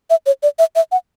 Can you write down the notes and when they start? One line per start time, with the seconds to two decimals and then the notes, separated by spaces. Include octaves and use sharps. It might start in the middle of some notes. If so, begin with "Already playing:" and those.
0.10 E5
0.26 C#5
0.43 D5
0.59 E5
0.76 E5
0.92 F#5